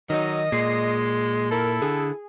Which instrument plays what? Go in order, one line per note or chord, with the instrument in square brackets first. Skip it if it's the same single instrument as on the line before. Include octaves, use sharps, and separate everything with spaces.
[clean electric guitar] D#3 D#4 [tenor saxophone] F#3 [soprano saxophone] D#5
[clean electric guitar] A#2 [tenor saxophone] G#3 [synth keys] C7
[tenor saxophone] E4 [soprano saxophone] A4 [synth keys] A#4
[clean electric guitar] D3 [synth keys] G#4